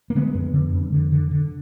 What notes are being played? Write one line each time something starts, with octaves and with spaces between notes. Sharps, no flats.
A#3
D3 G#3 B3
F2
D3
F2
D3
D3
D3